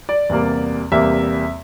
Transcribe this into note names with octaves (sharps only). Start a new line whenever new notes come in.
D5
E2 C3 G3 A#3
E2 C3 G3 A#3 E5